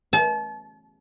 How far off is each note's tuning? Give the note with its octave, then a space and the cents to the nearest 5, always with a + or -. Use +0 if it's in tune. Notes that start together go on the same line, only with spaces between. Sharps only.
A5 -35